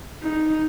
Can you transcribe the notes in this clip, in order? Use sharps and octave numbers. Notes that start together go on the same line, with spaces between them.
D#4